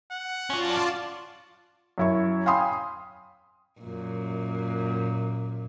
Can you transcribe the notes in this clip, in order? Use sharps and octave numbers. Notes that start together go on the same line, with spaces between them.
F#5
C#4 F4 F#4 D5 A5
F#2 E4 C#6
F5 G5 G#5 B5 C6 D#6
F#2 A#2